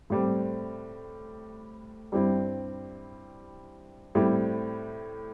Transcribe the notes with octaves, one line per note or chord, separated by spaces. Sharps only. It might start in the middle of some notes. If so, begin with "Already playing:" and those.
A2 G3 C4
G2 G3 C4 E4
A2 G3 C4 E4